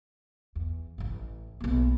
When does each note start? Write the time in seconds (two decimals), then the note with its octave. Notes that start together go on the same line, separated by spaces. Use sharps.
0.55 E2
0.98 A1 A2
1.60 B1 A#3